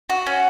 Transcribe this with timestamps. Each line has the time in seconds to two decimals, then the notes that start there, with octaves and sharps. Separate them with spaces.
0.10 F#4
0.27 C#4